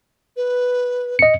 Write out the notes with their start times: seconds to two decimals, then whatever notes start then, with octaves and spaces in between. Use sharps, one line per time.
0.37 B4
1.19 D#5 C#7